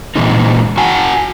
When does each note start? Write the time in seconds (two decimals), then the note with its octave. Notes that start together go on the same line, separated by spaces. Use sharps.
0.16 A#2 C#3 E3 G#3 C4 D#4
0.78 F#4 F#5 G#5 A5